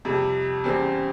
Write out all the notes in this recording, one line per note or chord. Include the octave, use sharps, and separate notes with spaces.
F2 C3 G3
E2 C#3 G3 C4